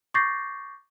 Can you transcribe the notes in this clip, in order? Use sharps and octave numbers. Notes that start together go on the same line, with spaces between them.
C#6 D6 G6 A6 A#6 C7